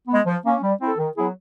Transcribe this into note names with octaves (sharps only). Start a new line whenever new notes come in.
G#3 B3
F3
A#3 C#4
G3
C4 E4 A4
D#3
F#3 B3 E4 G#4